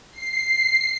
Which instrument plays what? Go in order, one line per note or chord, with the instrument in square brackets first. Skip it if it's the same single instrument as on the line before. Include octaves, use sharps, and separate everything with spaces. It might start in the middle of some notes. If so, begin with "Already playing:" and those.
[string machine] C7